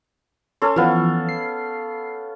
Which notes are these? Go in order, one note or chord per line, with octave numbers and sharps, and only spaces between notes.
C#4 A4 C6
E3 F3 B3 F5
C7